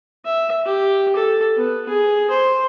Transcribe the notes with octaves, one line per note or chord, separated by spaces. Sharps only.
E5
G4
A4
B3
G#4
C5